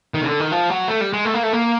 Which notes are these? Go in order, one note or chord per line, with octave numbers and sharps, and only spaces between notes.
D#3
C#3
D3
D#3
F3
F#3
A3
G3
G#3
A3
A#3
A3
A#3